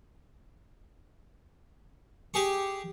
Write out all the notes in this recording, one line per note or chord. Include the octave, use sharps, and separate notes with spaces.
G4 G#4 C#6